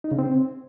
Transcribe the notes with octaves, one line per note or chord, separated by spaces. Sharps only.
D#4
C#3
C4